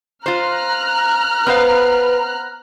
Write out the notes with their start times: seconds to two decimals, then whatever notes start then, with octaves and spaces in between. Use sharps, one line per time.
0.26 F4 C5 A#5 F6 F#6
1.47 B3 B4 C5 F5